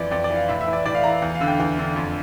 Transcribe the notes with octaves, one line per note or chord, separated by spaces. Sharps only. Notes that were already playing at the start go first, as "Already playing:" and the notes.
Already playing: F2 E3 D5
F2 D5
D5
E3
F5
A2 E5
E5
E3
D5
A2 D5
F5
E3 A#5
E2
F5
D3
G5
E2
D3
F2